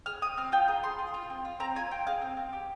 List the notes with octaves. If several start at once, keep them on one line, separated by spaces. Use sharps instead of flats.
G#4 F6
C4 D#6
C4 F6
F4 G5
G#4 A#5
G#4 C6
F4
F4
C4
F4
C4 A#5
F4 G#5
F4 G5
G#4 F5
C4
C4
G4